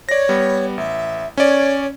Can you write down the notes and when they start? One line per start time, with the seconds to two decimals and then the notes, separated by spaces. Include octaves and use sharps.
0.09 C#5 D5 A#6
0.29 G3 B3
0.78 A1 E5
1.37 C#4 C#5 D5